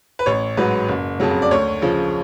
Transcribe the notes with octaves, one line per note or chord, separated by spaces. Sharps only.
B4
A1 C#5
G#2 F#3 B4
F#1
F2 C#3 F#3
D5
D2 C#5
C#3 F3